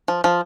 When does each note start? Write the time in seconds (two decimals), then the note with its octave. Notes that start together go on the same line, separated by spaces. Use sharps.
0.08 F3
0.24 F3